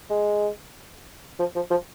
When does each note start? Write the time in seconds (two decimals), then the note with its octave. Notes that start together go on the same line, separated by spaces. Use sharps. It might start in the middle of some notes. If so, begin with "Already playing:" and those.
0.09 G#3
1.39 F3
1.55 F3
1.70 F3